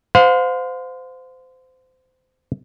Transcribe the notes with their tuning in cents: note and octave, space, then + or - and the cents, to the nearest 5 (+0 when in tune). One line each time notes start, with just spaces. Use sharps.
C5 -25 F5 +35